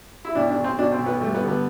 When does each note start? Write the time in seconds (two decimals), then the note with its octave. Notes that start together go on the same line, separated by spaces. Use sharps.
0.25 E4
0.35 B1 D4
0.50 D4
0.57 B1
0.64 C4
0.78 B2 D4
0.92 C4
0.99 B1
1.06 B3
1.20 G2 A3
1.35 B3
1.41 D3
1.48 B3